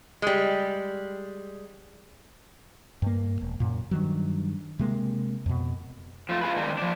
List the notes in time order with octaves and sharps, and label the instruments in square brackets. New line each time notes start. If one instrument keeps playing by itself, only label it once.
[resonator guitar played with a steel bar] G3 G#3
[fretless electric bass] G2 A#3
E1
F#2 A#2
G2 D#3 F#3
C3 G#3 A#3
F2 B2
[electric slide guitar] F3 A3 E4 F4
F4 G#4 B4
D#3 G#3 D4 A#4
F3 D4